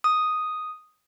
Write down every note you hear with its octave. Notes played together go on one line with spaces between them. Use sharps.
D#6